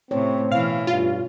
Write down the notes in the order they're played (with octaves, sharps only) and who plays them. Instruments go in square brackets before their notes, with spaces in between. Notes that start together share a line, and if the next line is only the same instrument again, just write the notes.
[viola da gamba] A2 C3 [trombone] C4 [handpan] C#5
[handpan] B2 [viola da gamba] E3 [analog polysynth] F5
[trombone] G2 [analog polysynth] F4